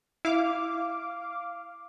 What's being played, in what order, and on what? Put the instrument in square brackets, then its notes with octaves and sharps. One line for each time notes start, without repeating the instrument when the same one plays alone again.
[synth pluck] E4 [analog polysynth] F5 D6